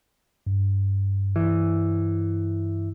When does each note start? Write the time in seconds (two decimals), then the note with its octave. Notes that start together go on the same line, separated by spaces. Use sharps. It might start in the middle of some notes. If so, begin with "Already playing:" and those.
0.47 G2
1.36 E3